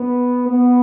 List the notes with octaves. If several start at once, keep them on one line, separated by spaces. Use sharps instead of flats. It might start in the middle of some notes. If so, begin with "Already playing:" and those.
Already playing: B3
B3